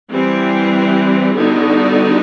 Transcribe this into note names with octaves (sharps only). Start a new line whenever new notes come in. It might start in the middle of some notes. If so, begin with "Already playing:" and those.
E3 G3 C4
D3 G3 B3 D#4 F#4